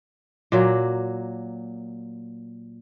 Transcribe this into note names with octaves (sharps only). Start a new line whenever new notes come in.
A#2 F#3 A#3